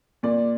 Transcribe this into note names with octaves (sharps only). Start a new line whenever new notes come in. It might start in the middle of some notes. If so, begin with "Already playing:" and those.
A#2 D5